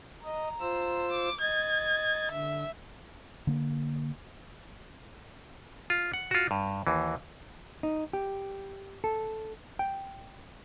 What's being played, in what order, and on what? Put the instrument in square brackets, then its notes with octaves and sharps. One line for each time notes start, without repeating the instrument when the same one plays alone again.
[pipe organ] D#5 [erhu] A#5
[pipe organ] F4 C5 E6
[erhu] D6
[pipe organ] D#5 A6 [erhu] G#6
[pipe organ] D3 [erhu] E5
[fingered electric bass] D3 A#3
[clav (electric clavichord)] F4
F#5
F4 F#4
G2
D#2 E3
[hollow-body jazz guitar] D#4
G4
A4
G5